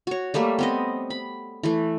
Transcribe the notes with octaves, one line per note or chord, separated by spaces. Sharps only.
F#4 C#5
G3 A3 A#3 E5
B3 C4 D#5
B5
E3 A3